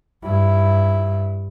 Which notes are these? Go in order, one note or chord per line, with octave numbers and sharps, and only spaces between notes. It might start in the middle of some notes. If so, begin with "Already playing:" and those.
G2 E4